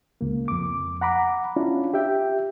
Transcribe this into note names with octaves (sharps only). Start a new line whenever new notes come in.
C#2 A#3
F2 D6
F#5 A#5 B5 D6
C#4 D4 E4 F4
G4 E5 G5